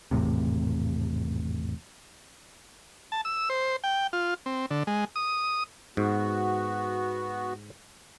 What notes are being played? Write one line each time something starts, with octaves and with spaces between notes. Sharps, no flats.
G#1 E2 A2 C3
A5
E6
C5
G5
F4
C4
D3
G#3
D#6
G#2 B3 F#4